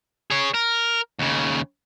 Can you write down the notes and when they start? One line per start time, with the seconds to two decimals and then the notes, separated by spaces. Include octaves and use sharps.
0.31 G#4 C#5
0.54 A#4
1.19 D#2 C#3